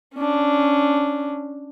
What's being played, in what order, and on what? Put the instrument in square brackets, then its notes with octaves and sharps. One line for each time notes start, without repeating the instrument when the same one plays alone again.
[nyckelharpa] C#4 D4